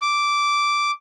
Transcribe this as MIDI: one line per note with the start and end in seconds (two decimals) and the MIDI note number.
0.02 0.91 86